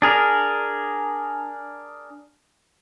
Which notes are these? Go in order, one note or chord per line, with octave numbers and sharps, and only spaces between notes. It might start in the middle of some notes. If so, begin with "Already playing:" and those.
D4 G#4 A#4